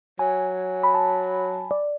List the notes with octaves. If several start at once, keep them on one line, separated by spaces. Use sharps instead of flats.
F#3 G#5
B5
A5
D5